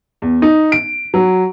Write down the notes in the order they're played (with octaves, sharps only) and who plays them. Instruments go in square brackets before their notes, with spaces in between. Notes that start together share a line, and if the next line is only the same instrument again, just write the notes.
[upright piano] E2
D#4
D7
F#3